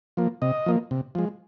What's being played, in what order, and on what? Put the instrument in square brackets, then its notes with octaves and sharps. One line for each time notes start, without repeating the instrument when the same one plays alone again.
[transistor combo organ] F3 A#3
C3 D#5
F3 A#3
C3
F3 G#3